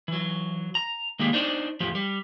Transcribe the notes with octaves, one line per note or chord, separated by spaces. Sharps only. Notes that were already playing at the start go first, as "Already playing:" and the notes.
E3 F#3
A#5
D#3 G#3 A#3 G4
D4 D#4 C5 D5
E2 A2 F3 G4
G3